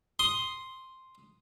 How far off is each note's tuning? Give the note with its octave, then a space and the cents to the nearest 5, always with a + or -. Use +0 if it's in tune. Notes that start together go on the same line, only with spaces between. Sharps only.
C6 +0 D#6 +0